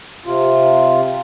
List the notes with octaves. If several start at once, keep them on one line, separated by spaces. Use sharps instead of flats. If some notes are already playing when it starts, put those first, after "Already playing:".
C3 F4